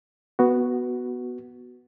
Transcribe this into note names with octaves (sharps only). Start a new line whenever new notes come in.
B3 F#4